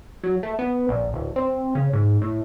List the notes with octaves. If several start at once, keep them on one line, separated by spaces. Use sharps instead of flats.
F#3
A3
B3
A#1
D1
C4
C#3
G#2
A2